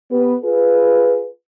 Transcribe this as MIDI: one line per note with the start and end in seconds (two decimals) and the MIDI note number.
0.10 0.34 59
0.10 0.34 67
0.10 0.34 71
0.44 1.27 65
0.44 1.27 68
0.44 1.27 71